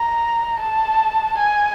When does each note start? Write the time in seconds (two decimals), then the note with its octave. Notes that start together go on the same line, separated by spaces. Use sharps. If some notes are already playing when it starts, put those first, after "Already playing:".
Already playing: A#5
0.59 A5
1.37 G#5